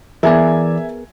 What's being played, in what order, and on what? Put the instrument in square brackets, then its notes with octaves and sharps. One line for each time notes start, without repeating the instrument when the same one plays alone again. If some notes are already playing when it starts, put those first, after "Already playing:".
[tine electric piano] E3 D5 [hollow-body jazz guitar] B3 G#4 A#4 [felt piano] E5 G#5